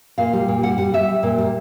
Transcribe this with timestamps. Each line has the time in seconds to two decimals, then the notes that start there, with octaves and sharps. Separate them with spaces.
0.18 A#2 F5
0.33 G3
0.48 A#2
0.63 G3 F#5
0.78 G3 F#5
0.93 G3 E5
1.09 G3
1.23 A#2
1.38 G3